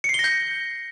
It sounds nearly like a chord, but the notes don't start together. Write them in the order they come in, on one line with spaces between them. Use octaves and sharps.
C#7 C7 G7 A#6 G6